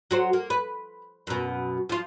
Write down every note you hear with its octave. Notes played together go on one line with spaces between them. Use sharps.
F#3 F#4 C5
A#3
B4
F#2 B2
F3 F4